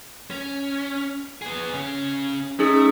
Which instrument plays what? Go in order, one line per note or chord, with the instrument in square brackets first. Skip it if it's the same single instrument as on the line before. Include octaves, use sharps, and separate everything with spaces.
[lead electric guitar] C#4
B3 G#4
C#3 C#4
[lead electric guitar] A3 [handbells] C#4 D#4 G#4